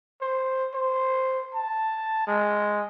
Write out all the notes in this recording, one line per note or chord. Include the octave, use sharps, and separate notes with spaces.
C5
C5
A5
G#3